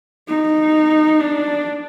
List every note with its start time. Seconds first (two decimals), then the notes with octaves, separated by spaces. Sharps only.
0.28 D#4
1.20 D4